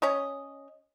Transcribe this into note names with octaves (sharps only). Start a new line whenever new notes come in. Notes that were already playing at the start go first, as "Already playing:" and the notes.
C#4 C#5 D#5